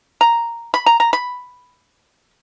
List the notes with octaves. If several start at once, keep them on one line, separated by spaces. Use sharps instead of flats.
A#5
B5
A#5
A#5
B5